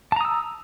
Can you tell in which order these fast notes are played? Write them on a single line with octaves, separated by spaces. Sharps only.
A5 A#5 D#6 E6